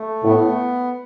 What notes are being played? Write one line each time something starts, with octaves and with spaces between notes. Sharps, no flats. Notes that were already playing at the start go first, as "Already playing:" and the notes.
Already playing: A3
A2 B3